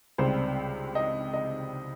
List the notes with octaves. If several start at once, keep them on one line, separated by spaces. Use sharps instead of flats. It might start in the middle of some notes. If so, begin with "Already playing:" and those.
C#2 C3 G3 C5
D#5
D#5